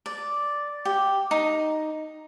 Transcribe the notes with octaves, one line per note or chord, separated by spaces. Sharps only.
D5
G4
D#4